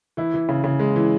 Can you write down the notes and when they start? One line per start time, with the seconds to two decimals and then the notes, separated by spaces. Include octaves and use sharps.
0.17 E3 E4
0.34 E3
0.49 C#3
0.64 C#3
0.80 G#3
0.96 E3